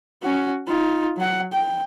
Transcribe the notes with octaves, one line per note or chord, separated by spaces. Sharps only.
C#4 F#4
D#4 F4
F#3 F#5
G5